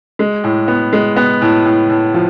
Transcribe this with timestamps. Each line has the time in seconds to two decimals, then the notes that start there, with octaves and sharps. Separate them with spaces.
0.19 G#3
0.44 A2
0.68 B3
0.93 G#3
1.16 B3
1.41 A2
1.65 A2
1.90 A2
2.14 F3